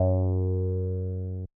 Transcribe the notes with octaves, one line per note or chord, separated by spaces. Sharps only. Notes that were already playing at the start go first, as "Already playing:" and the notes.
Already playing: F#2